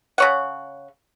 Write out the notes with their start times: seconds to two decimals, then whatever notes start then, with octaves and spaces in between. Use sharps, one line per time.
0.18 C#3 C#5 F#5